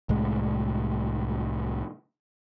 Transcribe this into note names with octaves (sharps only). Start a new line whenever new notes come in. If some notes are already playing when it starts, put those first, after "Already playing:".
C2 A2 G#3